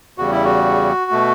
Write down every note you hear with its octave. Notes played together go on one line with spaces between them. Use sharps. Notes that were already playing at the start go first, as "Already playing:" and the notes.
E2 C#3 G3 F#4
E4
F#4
B2 A3